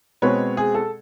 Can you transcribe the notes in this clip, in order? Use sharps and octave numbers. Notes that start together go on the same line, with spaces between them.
B2 G#3 C4 B4 C#5
G#4
A4